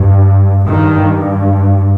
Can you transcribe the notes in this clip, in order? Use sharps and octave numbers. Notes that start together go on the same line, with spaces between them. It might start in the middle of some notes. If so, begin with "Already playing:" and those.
Already playing: G2
G2 D#3